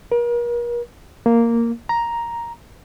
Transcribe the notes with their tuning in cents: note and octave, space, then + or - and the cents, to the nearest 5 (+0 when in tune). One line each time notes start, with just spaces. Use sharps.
A#4 +40
A#3 -5
A#5 +5